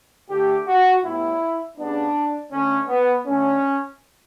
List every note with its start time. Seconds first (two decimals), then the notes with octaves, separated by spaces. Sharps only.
0.29 D3 A3 G4
0.66 F#4
1.03 A2 G3 B3 E4
1.77 C#3 G3 B3 D4
2.51 D3 A3 C#4
2.88 B3
3.25 D3 A3 C#4